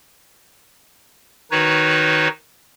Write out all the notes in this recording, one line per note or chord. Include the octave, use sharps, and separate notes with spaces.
D#3 D#4 F#4 B4 C#5